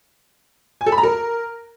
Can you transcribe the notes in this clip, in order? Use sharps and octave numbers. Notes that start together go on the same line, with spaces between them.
G#5
A4
B5
A#5
A#4